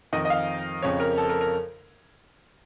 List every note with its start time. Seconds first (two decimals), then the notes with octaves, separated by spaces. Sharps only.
0.13 F2 D#3 D#5
0.25 D#5
0.30 F5
0.83 F2 C#3 F3 C#5
1.00 A#4
1.18 A4
1.29 A#4
1.41 A#4